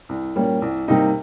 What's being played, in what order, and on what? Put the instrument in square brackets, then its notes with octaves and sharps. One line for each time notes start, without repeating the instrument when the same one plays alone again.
[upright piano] C2
A#2 G3 A#3 C#4
C2
C3 G3 A#3 D#4